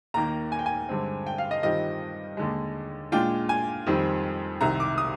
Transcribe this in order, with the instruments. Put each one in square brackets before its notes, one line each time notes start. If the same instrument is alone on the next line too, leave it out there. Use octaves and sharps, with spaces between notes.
[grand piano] D#2 D#3 A#3 A#5
G#5
G5
G#5
G2 D3 G#3 C4
G5
F5
D#5
G2 D#3 G3 C4 F4 D#5
D#2 D3 G#3
A#2 G#3 D4 F4 G5
G#5
F2 D#3 G3 C4
C2 C3 D#3 A#5
D6
D#6